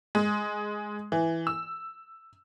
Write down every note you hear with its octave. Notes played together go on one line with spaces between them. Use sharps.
G#3
E3
E6